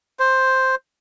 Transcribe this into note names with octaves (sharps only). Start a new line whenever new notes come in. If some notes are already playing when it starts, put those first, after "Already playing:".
C5